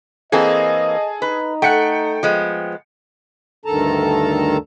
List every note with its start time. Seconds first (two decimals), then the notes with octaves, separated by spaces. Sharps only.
0.32 E3 A#3 C4 G#4 A4 D#5
1.22 D#4 B4
1.62 A3 F#5 G5 C#7
2.23 F3 G#3 B3
3.66 D2 G2 D#3 A4 A5 A#5